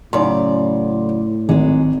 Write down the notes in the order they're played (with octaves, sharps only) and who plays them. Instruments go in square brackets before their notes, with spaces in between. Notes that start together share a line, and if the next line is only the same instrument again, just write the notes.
[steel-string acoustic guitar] F#2 C#3 D5 [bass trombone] A2 [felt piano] D#4 C6
[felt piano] G#1 [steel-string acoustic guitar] F#3 G#3